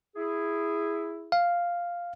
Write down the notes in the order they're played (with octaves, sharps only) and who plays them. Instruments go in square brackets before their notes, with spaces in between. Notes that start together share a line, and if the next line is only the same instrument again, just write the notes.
[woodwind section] E4 G#4
[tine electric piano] F5